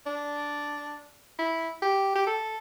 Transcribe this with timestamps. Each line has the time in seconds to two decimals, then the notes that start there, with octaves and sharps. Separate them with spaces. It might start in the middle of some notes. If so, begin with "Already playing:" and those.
0.07 D4
1.39 E4
1.82 G4
2.16 G4
2.27 A4